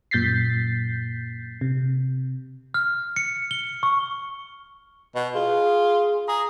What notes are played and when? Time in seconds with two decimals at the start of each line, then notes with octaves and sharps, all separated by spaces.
0.11 F#2 A#2 G6 A6 B6 C7
1.61 C3
2.74 F6
3.16 C#7
3.51 G7
3.83 C#6
5.15 B2
5.35 F4 G#4
6.28 G#4 A#5